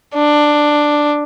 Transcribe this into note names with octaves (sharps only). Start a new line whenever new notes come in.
D4